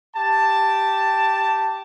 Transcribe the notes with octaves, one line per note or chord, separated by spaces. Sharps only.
G4 A5